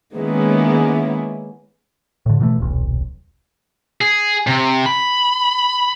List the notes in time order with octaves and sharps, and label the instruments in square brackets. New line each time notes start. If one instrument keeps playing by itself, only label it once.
[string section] D#3 G#3 A#3 B3 C#4 E4
[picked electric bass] A2 D3
B2 E3 F#3 A3
D#1 B1
[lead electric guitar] G#4
C3
B5